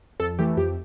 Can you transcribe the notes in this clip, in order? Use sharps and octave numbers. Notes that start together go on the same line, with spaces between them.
F2 A4
E3 A3 G4
F2 G4